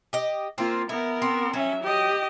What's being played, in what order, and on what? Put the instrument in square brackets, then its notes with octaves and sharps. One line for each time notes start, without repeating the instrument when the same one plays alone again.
[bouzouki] G4 D#5
[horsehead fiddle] A#3 F4 [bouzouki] C4
[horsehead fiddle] B3 A#4 [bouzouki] E4
[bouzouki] C4
[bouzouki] F#3 [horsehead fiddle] C#4 E5
[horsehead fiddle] G4 D#5